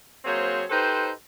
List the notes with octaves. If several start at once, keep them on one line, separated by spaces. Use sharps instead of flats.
F#3 A#3 C4 G#4 C5 C#5
D#4 G4 A4 B4 C5